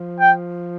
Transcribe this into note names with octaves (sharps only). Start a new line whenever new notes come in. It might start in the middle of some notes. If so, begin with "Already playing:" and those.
Already playing: F3
G5